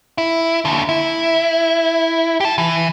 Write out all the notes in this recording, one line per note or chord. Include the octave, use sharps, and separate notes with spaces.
E4
D#2 D3
E4
G4 A5
E3